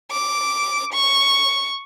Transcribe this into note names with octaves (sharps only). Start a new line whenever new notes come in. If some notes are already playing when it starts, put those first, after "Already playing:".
D6
C#6